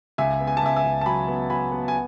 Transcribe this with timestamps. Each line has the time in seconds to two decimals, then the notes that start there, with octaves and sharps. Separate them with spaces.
0.18 C#2 E5 G#5
0.40 B3
0.47 G#5
0.57 A5
0.62 C#2 E5 G#5
0.76 E5 G#5
0.84 C#2
1.01 A5
1.06 F#3 G#5 B5
1.28 B3
1.50 F#3 G#5 B5
1.72 B3
1.88 G#5